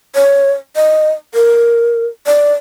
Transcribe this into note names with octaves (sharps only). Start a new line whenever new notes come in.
C#5
D#5
A#4
D5